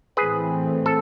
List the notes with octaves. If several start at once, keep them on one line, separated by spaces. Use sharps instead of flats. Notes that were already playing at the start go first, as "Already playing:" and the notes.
A2 E3 A3 C4 G#4 B4
A4